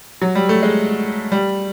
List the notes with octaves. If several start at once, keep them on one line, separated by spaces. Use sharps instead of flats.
F#3
G3
A3
G#3
G3